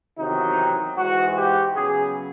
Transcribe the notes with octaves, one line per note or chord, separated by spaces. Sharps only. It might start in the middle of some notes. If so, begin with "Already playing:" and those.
E2 C3 D#3 F#3 D#4
G#2 E3 G#3 F#4
G4
C#3 F#3 B3 G#4